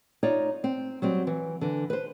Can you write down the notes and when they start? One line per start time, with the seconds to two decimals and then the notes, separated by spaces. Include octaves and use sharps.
0.23 D#4 F4 C#5 D5
0.64 C4
1.02 F#3 G3 C4
1.27 E3
1.61 D3 E3
1.90 B4 C5